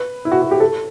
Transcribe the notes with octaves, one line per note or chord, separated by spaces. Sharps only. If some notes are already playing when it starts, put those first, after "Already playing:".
Already playing: B4
E4
F#4
F#4
G4
A4